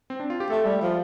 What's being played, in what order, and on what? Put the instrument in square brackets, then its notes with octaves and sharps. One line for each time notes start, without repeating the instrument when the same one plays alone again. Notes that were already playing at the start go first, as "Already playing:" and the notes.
[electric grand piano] C4
D4
F4
G4
[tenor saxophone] A3 [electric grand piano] A4
[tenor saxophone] G3
F3